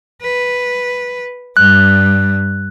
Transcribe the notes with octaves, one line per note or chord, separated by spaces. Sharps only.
B4
G2 G3 F#6